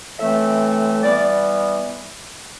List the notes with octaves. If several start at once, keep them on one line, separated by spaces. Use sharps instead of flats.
A2 E3 A3 C4 E5
E3 G3 B3 D5